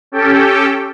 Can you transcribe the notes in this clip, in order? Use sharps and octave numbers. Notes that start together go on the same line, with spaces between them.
C#4 G4 A4 G5